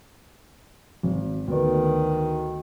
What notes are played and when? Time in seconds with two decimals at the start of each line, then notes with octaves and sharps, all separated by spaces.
1.03 G#1
1.48 D2 D#3 B3 D5